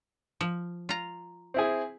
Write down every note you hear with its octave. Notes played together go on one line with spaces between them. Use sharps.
F3
F4 A#5
C4 E4 G#4